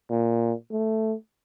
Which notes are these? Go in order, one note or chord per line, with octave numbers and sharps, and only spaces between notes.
A#2
A3